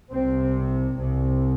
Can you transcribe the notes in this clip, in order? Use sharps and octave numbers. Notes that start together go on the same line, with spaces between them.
C2 C3 C4
C2 C3